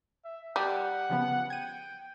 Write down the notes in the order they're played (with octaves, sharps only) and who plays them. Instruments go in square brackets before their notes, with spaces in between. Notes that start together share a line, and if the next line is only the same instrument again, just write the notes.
[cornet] E5
[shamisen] G3 [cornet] F#5
[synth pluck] C#3 F3 B3
[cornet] G5 [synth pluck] G#6 D#7